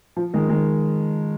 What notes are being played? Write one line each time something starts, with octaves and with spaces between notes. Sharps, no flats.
F3
D#3 G#3
D#3 G#3